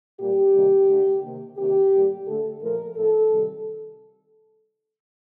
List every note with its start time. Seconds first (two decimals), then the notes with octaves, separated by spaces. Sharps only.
0.20 A#2 G3 A#3 G4
0.54 C3 D#3 G3 A#3
0.89 D3 A3
1.24 C3 D#3 A#3
1.58 C3 D#3 A#3 G4
1.93 A2 G3 A#3
2.27 D3 A3 A4
2.62 A#2 F3 A3 A#4
2.97 A2 F3 A3 A4
3.32 C3 D#3 G3